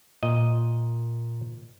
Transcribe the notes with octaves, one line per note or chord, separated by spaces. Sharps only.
A#2 D#5